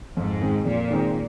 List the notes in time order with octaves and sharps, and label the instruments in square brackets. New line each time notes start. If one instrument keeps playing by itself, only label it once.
[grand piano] F2 [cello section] G#2
[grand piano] D#3 G#3 C4
[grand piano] F2 [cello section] A#2
[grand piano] D#3 G#3 C4